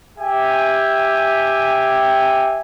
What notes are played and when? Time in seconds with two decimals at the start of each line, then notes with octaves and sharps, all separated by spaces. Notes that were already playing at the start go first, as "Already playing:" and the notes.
0.18 G4 E5 G5 G#5